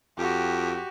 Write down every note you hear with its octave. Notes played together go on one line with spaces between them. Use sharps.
F2 F#4 G4